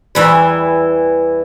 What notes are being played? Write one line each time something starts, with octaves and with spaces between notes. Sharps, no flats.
E2 E3 G3